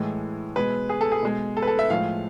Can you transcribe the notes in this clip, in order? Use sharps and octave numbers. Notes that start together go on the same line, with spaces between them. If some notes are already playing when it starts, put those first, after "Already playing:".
Already playing: A2 E3 G#3
B2 G#3 B4
G#4
A4
G#4
B2 G#3
A4
B4
A4
E5
A2 F3 G#3 F5